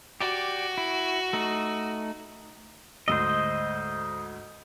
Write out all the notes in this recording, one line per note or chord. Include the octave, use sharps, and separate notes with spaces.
F#4 G4 D5
E4
A3 D#4
D2 G#2 C5 D#5 E6